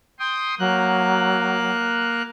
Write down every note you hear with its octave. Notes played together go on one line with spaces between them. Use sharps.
G5 C6 D#6
F#3 A#3 F#6